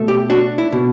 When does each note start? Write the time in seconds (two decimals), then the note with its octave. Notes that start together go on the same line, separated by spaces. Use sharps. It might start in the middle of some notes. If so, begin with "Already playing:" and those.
Already playing: B2 A3
0.08 G4
0.30 D4 F#4
0.58 E4
0.72 B2